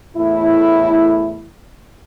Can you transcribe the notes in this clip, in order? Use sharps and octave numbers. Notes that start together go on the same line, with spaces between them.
E2 A2 A3 E4